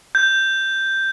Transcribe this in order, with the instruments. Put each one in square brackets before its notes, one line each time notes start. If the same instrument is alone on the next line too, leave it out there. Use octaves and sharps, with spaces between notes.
[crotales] G6